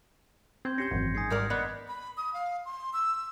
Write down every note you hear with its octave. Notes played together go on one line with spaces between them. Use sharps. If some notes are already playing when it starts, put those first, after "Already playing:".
C4 C6 G6 G#6
C#4 G4 G6 A#6 C7 C#7
G#1 F#2 E3 C4
G#3 D#4 G#5 D#6 G#6 C7
G#2 G3 G4 A#4 D5
B3 A#4 D5 D#5
B5
D#6
F5
C6
E6